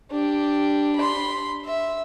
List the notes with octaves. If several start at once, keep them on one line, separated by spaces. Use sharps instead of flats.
D4 G4
B5 C6
E5